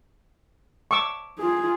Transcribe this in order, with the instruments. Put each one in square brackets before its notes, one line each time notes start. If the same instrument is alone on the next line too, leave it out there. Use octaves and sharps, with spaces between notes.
[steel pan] C#6 D6 E6
[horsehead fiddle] F4 G#4